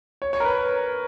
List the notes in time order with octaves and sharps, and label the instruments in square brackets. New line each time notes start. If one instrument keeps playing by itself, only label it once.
[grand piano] C#5
C#5
A#4
B4